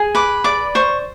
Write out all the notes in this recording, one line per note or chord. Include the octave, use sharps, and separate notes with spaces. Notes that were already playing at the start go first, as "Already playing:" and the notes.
Already playing: G#4
B4 D6
D5 D6
C5 C#6